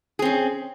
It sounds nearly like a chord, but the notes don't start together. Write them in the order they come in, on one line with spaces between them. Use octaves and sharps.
G#4 C4 C#4